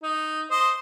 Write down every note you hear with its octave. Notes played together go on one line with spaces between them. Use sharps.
D#4
C5 D#5